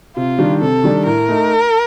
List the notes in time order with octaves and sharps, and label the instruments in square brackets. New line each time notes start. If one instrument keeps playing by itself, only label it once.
[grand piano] C3 [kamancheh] F4
[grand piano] D#3 G3 D4
[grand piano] C3 [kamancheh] A4
[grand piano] D#3 G3 D4
[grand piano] A2 [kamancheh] A#4
[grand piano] A3 D#4